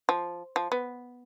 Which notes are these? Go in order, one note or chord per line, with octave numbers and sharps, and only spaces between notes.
F3
F3
B3